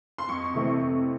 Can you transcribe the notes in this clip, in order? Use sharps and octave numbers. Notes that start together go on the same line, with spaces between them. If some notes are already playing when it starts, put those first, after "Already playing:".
C6
F2 C#6
C3 E3 A3 C4
F2